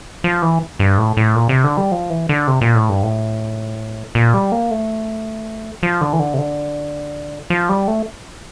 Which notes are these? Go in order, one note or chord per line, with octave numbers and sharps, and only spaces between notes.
F3
E3
G2
A2
A2
A#2
C3
D3
G3
F3
E3
D3
C3
A#2
A2
G2
A2
A#2
G3
A#3
A3
F3
D3
E3
D3
C3
D3
F3
G3
A3